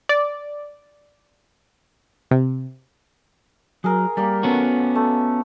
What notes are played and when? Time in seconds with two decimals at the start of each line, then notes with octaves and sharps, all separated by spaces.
0.09 D5
2.31 C3
3.84 F#3 G#4 A#4
4.17 G3 A#3 G4 A#4
4.43 A3 B3 C#4 F#4
4.95 A3